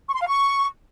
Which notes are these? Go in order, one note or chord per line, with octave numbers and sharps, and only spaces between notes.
C#6
C6
F5
C#6